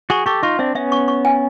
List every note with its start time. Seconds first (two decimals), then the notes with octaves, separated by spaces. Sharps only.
0.10 F#4 G#4 C#6
0.26 G4 A4 C#6
0.43 D#4 F4 C#6
0.59 C4 D4 E5
0.75 B3 C#4 E5
0.92 C#6
1.08 C#6
1.25 G#5